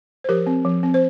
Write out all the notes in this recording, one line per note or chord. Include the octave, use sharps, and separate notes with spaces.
C5
F3 G4 A#4
C4
F3
C4
C5